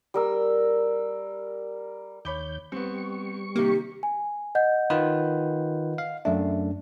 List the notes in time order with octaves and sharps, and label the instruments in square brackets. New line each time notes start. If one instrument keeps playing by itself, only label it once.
[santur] G3 A#4 E6
[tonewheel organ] D#2 G6 [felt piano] C#5 B5 D6
[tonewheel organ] G3 C#6 [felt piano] B3 C4
[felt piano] C3 D#3 [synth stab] A#3 [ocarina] G4
[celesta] G#5
D#5 F#5 G6
[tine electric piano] D#3 F4 B4
F5
[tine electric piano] F#2 A3 D4 [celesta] E5